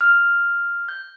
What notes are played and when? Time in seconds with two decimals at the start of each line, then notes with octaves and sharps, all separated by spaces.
0.01 F6
0.88 G6